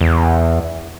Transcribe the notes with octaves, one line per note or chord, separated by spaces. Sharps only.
E2